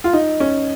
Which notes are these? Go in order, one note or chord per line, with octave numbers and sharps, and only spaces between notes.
F4
D#4
C#4